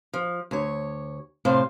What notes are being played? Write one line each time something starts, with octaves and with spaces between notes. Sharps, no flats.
F3
D2 C#5
A2 C3 C5 F5